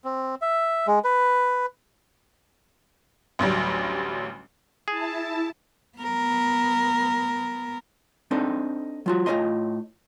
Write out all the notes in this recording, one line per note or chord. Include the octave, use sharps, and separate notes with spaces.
C4
E5
G#3
B4
A1 D2 F#3 G3
E4 G#4 A5
B3 A#4
C4 D4 D#4 A4 C5
F#3 F4 F#4
A2 F4 B4 C#5 D#5 C6